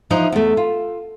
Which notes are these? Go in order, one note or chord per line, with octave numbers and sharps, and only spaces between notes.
E3 F3 D#4 F#5
E2 A3
F4